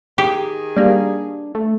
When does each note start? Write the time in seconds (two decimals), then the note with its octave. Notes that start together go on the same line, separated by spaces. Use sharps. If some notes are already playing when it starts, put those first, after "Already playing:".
0.18 D#3 G4 G#4
0.76 G3 A#3 D4
1.55 A3